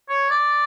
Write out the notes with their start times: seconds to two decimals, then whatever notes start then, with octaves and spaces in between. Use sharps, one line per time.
0.09 C#5
0.30 D5